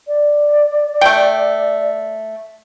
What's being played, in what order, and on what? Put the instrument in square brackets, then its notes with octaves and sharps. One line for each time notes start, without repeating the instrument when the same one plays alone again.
[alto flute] D5
[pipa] A3 G5